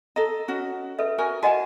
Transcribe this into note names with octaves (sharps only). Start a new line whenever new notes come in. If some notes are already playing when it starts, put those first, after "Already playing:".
A4 D#5 A#5
C#4 F#4
A4 B4 E5
F#4 A#4 G#5
F#4 D#5 F#5 G#5 A5